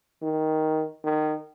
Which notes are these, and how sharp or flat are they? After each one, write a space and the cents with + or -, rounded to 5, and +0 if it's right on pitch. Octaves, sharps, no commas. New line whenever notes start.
D#3 +10
D#3 -20